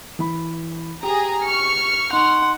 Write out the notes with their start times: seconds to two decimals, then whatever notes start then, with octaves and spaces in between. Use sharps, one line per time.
0.19 E3 B5
1.03 G4 G#4 A#5
1.45 C#6 F6 C#7
2.13 D#4 F#5 C6 F7